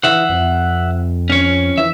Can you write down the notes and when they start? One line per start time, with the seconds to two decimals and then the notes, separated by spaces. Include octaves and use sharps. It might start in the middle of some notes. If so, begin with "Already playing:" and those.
0.04 E3 E5 F#5
0.29 F2
1.30 C#4 C#5
1.78 E3 E5